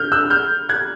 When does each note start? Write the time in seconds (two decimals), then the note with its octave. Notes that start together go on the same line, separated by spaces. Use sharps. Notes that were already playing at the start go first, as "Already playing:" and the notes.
Already playing: F6 G6
0.12 E6 F#6
0.30 F6 G6
0.69 F#6 G#6